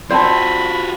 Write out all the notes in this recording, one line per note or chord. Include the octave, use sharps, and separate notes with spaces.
C4 F4 F#4 C5 D5 A5 B5